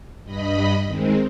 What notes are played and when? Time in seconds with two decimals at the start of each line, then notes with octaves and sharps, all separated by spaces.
0.24 G2 D#5 B5
0.87 D#3 G#3 C4